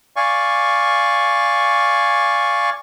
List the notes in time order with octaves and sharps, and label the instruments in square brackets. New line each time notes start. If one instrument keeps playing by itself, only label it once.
[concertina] D5 F5 G#5 C#6